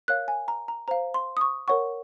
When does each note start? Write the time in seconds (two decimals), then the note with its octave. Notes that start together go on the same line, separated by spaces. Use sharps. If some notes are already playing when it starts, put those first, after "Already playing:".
0.08 A#4 C#5 F5 F#6
0.28 G#5
0.48 A#5
0.68 A#5
0.88 C5 F5 A#5
1.14 C6
1.37 D#6
1.41 C#6
1.68 A#4 C#5 F#5 C#6